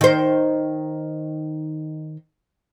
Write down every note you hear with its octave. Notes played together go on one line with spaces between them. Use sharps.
D#3 C5